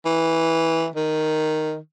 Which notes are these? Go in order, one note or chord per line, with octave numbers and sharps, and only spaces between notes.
E3
D#3